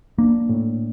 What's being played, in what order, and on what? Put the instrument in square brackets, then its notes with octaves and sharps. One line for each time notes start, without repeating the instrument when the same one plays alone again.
[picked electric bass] A#3 [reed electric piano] D4
[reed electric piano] A2